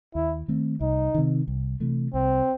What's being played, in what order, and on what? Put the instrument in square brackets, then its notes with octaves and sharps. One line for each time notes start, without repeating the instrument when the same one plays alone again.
[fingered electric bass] D#2 [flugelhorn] E4
[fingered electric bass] D#3 A3 C4
[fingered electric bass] C2 [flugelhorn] D#4
[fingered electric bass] C3 D#3
C2
C3 E3 A3
[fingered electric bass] C2 [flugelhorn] C4